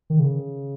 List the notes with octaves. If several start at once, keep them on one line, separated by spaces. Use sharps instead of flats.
D#3
C#3